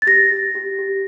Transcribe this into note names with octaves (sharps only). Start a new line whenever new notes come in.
A6
G4 A#6
G4
G4
G4